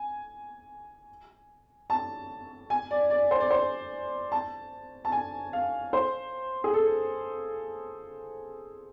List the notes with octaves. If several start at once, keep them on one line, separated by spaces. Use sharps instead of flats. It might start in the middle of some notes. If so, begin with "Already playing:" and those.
Already playing: G#5
A5
G#5
D5
D5
C5
D5
C5
A5
A5
G#5
F5
C5
G#4
A4